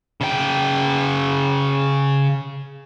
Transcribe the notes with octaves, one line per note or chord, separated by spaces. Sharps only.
C#3 G5